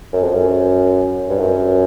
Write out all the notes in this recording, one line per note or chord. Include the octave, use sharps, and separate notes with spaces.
F#2
F2
F#2
G2
F#2